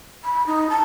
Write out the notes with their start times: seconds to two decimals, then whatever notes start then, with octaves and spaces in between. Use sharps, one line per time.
0.24 B5
0.46 D#4
0.70 A5